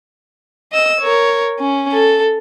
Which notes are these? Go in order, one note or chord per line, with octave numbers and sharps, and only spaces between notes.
D#5 E6
A#4 C#5
C#4
A4